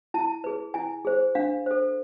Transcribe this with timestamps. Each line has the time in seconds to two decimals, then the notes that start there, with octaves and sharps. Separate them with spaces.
0.14 E4 A5
0.44 G#4 B4
0.74 E4 G#5
1.05 G#4 C5
1.35 D4 F5
1.66 A4 C5